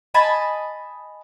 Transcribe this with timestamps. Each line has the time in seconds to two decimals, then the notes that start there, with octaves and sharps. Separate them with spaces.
0.14 D#5 G#5 A5 B5